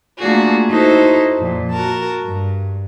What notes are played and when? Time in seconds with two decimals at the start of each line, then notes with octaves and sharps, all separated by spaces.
0.20 A3 A#3 D4 F4 F#4 G#4
0.69 D#4 E4 F#4 A4 C5
1.38 F2 A#2
1.71 F#4 A#4 A5
2.24 G2